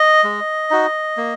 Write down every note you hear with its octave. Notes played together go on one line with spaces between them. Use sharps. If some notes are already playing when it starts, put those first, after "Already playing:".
Already playing: D#5
G#3
D#4 F#4
A#3